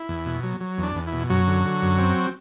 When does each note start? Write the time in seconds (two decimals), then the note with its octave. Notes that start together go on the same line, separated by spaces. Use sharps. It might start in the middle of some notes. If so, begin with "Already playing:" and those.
Already playing: E4
0.09 E2
0.26 B2
0.43 F#3
0.60 F#3
0.78 E2 D4
0.95 E2
1.07 E4
1.13 B2
1.30 F#2 F#3 F#4
1.47 D3
1.65 D3
1.82 F#2
1.98 C4